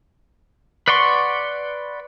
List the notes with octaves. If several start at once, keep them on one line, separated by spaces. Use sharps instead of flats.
B4 D5 F#5 C6 C#6